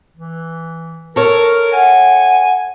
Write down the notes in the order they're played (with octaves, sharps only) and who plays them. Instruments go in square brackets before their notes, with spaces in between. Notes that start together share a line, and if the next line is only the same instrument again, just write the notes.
[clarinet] E3
[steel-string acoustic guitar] A4 C#5 [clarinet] A#4
[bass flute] F#5 [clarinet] G#5